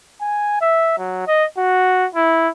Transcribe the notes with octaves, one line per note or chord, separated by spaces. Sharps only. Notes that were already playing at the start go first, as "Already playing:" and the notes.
G#5
E5
F#3
D#5
F#4
E4